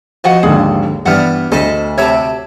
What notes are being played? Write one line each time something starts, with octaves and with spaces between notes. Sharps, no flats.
F3 F#4 D#5 F#5
G#1 D#2 D3 G#4
G2 E3 G3 B3 F#5 F6
D2 A4 C5 D#5 A5 B5
C3 C#5 E5 A5 B5